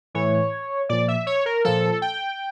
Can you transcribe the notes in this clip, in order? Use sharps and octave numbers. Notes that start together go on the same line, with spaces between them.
A2 E3 C#5
A#2 F3 D5
E5
C#5
A#4
A#2 F3 A4
G5